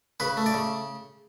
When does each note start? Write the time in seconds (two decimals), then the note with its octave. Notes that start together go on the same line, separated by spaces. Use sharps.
0.20 C#3 B4
0.37 A3
0.46 D5
0.54 C#3